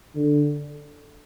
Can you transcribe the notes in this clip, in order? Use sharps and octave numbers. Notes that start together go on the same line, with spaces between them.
D3